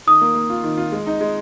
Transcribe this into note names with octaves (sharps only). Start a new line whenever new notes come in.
D#3 D#6
A#3
A#3
F4
D#3
F4
G#3
D#4
G#3